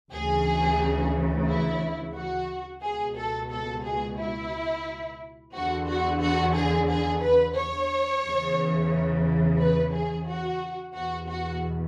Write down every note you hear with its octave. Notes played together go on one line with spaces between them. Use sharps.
D2 C#3 E3 G#4
E4
F#4
C#2 B2 G#4
A4
A4
G#4
E4
E2 D3 F#4
F#4
F#4
G#4
G#4
B4
C#5
E2 C#3 E3
B4
G#4
F#4
E2 B2 F#4
F#4